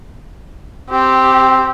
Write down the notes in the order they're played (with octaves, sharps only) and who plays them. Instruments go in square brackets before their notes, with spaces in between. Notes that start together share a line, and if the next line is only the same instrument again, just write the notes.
[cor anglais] C4 [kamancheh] G4